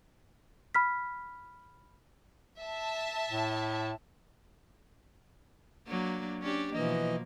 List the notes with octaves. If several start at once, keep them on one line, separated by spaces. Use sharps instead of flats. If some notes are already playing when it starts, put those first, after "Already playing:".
B5 F6 B6
E5 A5
A2
F#3 A#3 D4
C#4 D4 G4
B2 E3 F3 A#3 D#5